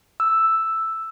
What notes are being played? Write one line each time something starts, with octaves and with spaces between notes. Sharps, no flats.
E6